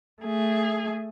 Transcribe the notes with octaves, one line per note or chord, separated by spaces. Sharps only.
A3 G#4